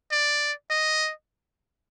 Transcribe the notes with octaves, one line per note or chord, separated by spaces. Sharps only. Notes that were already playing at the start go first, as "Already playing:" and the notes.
D5
D#5